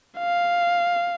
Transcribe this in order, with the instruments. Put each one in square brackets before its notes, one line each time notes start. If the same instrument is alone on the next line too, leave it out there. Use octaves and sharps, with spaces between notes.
[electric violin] F5